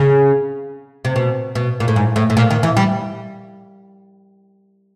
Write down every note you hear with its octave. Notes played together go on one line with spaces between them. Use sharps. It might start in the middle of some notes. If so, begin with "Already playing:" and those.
Already playing: C#3
C3
B2
B2
A#2
A2
G#2
A2
A2
A#2
D#3
E3
G3